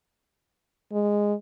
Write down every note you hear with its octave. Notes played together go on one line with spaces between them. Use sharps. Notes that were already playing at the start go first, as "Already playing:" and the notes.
G#3